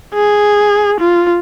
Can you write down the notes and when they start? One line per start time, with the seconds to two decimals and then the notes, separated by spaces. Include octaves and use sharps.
0.14 G#4
1.00 F4